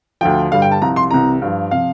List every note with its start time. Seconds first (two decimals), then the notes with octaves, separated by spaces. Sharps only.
0.21 D2 D3 F3 G5
0.51 G2 D3 G3 F5
0.62 G5
0.72 A5
0.82 C2 C3 F3 A#5
0.96 C6
1.11 C2 C3 E3 A#5
1.42 G2 F3
1.71 C3 F3 F5